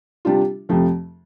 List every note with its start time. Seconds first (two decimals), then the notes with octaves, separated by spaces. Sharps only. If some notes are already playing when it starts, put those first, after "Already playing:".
0.25 C3 G3 D4 F4
0.69 F2 C3 F3 A3